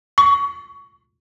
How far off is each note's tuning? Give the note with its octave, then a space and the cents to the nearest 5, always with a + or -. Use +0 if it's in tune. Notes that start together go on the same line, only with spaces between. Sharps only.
C#6 +20